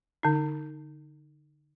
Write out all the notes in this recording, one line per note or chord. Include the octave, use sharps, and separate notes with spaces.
D3 D#4